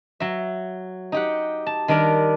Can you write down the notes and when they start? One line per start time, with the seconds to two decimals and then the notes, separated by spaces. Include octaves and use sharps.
0.20 F#3 E5
1.12 D#4 G4 F#5
1.66 A5
1.88 D#3 G3 D4 A#4 D5